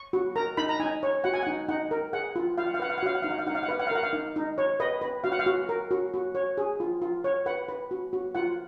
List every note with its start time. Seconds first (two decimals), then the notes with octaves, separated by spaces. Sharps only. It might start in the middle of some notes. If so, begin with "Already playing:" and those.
Already playing: C#6
0.13 F#4
0.36 A#4 A#5
0.57 D#4 B5
0.69 A#5
0.80 D#4 G#5
1.03 C#5
1.24 F#4 F#5
1.34 G#5
1.43 D#4 F#5
1.69 D#4 F#5
1.91 A#4
2.13 G#4 F#5
2.36 F4
2.58 F4 F5
2.66 F#5
2.74 F5
2.80 B4 F#5
2.90 F5
2.98 F#5
3.03 F#4 F5
3.15 F#5
3.22 D#4 F5
3.31 F#5
3.39 F5
3.47 D#4 F#5
3.55 F5
3.63 F#5
3.68 B4 F5
3.80 F#5
3.87 F5
3.91 A#4 F#5
4.03 F5
4.13 D#4
4.36 D#4
4.58 C#5
4.80 B4 D#5
5.02 B4
5.24 F#4 F5
5.32 F#5
5.39 F5
5.46 F#4
5.69 A#4
5.91 F#4
6.14 F#4
6.35 C#5
6.58 G#4
6.80 F4
7.02 F4
7.24 C#5
7.46 B4 F#5
7.68 B4
7.91 F#4
8.13 F#4
8.35 F4 F#5